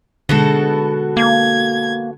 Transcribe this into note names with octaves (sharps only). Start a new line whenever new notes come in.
B2 D3 G#3 F#4 A4
A#3 G#6